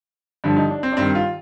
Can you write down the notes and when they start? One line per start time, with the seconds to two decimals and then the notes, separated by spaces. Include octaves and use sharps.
0.44 G2 D3 F3
0.56 D#4
0.70 D4
0.83 C4
0.92 D4
0.97 G2 D#3 C4
1.15 F4